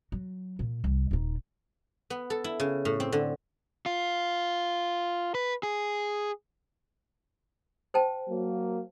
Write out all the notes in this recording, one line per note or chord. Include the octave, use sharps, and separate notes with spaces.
F#3
A#2
C2
D#1 D#4
B3
A4
E4
C#3
A2
C4
D3
F4
B4
G#4
C5 G5 A5
F#3 A#3